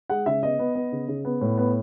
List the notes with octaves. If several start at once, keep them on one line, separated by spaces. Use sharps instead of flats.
G#3 F#5
C#3 E5
B3 D#5
B3
B3
C#3
C#3
B3
A2
B3